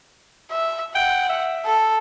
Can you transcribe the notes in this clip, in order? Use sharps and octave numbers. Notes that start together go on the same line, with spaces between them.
E5
F#5 G5
E5
A4